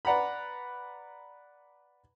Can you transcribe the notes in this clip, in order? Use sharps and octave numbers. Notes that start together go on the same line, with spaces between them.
B4 D5 F#5 A#5 B5